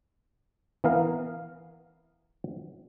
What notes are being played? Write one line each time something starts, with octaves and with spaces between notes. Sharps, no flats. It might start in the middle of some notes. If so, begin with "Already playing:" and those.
E3 B3 A#4 F5